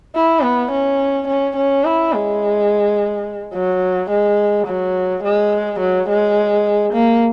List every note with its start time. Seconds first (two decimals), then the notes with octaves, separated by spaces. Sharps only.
0.15 E4
0.43 B3
0.71 C#4
1.28 C#4
1.56 C#4
1.84 E4
2.13 G#3
3.54 F#3
4.10 G#3
4.67 F#3
5.23 G#3
5.80 F#3
6.09 G#3
6.93 A#3